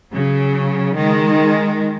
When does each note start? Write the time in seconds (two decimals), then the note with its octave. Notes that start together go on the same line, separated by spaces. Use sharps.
0.12 C#3 F#3
0.95 D#3 G#3